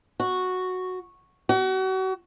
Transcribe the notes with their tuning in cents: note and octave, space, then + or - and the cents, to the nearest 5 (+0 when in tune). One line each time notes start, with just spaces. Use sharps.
F#4 -5
F#4 +35